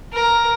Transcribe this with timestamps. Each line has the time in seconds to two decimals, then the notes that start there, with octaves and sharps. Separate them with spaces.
0.13 A#4